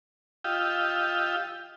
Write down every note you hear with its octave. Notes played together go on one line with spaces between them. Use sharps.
F4 G4 D#5 F5 G5 E6